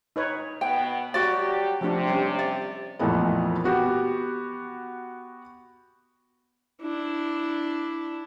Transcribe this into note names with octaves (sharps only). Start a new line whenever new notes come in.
D#4 B4 C#5
B2 B3 G5
F#3 G3 F#4 G4 D5
C3 F3 A3 D4
G3 C#4
D5
F2 A#2 E3 A3 B3
B3 F#4 G4
D4 E4